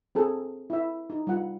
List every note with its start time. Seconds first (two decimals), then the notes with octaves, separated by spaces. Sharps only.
0.15 C4 G#4 A4
0.70 E4 E5
1.10 D#4
1.27 G3 F4 F#5